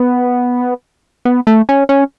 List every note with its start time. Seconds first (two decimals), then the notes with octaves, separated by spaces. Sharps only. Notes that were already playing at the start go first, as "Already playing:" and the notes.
Already playing: B3
1.25 B3
1.47 A3
1.69 C#4
1.89 C#4